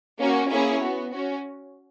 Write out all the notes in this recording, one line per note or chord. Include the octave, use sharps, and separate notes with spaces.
A#3 C#4 F#4
A#3 C#4 E4 G#4 C#5
B3 F#4
C#4 F#4